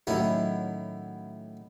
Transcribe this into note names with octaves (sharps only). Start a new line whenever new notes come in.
A2 D#3 F#3 C#4 E4 F#4